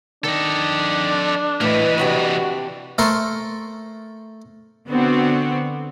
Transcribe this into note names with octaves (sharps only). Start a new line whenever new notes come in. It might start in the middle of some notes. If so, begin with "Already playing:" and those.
D#3 D4 A4 D#5
A2 E3 A#3 B4 D#5
C3 D4 F#4 G4
A3 A4 A#4 C5 C6 C#6
D3 B3 C4 F#4